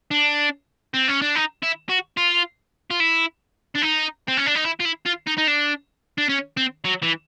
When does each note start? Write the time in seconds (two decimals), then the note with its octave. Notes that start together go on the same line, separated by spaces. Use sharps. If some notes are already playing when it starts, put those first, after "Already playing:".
0.11 D4
0.94 C4
1.08 C#4
1.22 D4
1.35 D#4
1.62 E4
1.89 F#4
2.17 F4
2.91 F4
3.00 E4
3.76 D4
3.82 D#4
4.28 C4
4.37 C#4
4.46 D4
4.55 D#4
4.65 E4
4.80 F4
4.85 E4
5.06 F4
5.27 D#4
5.38 D#4
5.48 D4
6.18 D4
6.29 C#4
6.57 C4
6.85 F#3
7.03 E3